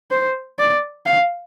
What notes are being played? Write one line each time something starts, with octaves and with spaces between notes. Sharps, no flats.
C5
D5
F5